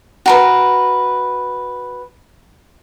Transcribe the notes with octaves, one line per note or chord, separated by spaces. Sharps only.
F#4 A#4 B4